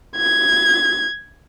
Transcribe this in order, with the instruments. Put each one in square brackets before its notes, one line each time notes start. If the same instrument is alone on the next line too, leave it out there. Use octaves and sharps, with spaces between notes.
[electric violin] G#6